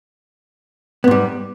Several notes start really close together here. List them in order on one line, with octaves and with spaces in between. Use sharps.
B3 G#2 G3